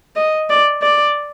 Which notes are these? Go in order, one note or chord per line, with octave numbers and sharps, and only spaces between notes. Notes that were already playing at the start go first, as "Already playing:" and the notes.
D#5
D5
D5